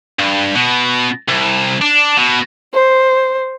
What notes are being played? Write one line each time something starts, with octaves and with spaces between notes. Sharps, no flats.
G2
B2
C2
D4
B2
C5